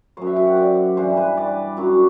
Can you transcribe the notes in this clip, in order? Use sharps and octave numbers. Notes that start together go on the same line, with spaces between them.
F#2 F#3 C5
E5
G5
F#5
D5
G2 E3 G3 C5
B4
D5
F#2 F#3